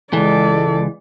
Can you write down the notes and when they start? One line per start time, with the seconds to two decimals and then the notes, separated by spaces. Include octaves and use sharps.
0.13 C#2 E3 G#3 A4 D5